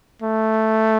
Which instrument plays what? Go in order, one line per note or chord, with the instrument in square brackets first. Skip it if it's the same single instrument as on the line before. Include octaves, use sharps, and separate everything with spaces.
[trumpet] A3